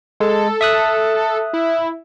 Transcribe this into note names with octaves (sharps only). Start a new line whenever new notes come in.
G#3 A4
E5 D#6 F#6
E4